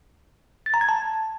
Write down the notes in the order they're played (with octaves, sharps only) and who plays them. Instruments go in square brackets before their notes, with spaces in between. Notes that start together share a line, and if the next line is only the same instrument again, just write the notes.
[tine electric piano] A6
A#5
G#6
A5